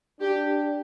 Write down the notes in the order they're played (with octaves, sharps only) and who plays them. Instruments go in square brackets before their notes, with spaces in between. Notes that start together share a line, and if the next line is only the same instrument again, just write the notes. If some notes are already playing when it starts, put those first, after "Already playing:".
[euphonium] D4 [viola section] G4